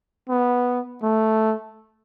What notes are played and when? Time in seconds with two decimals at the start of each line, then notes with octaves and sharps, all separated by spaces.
0.29 B3
1.03 A3